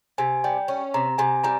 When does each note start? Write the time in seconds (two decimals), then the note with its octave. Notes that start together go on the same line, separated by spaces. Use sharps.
0.18 C3 G#5
0.44 G3 G5
0.68 C#4
0.94 C3 A#5
1.18 C3 G#5
1.44 G3 A#5